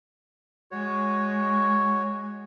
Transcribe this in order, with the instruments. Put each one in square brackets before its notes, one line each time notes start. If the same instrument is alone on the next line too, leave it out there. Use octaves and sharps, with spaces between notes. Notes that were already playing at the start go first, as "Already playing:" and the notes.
[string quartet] G#3 [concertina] F#4 C#5